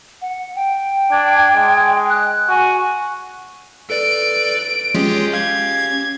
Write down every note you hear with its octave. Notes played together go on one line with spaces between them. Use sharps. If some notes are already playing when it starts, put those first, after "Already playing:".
F#5
G5
D4 G#6
G#3
F#6
F#4 G#5
A4 B4 D5 D7
G#3 C#4 F4 G4 G#4
F5 G#6